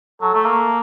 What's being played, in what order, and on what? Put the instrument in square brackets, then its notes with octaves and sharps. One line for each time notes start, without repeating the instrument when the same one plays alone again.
[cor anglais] F#3 [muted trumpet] A4
[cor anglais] A3
A#3